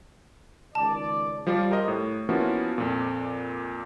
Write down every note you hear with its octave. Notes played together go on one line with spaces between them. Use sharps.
C#2 D#3 D5 A5
F3 G3 F4 D5
G4 A#4 C5 D#5
A2
F3 A#3 B3 C#4 E4 F#4
F2 A#2